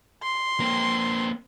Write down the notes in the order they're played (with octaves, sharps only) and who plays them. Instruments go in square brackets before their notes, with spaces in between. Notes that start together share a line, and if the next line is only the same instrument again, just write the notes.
[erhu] C6
[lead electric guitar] A#3 C4